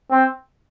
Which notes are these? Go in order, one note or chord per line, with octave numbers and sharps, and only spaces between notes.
C4